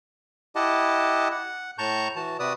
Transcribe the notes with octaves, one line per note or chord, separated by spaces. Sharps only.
E4 G4 D#5 F#5 A5
F#5
A2 A5 A#5 C#6 G6
E3 F#4 A5
C3 F#4 B4 D5 D#6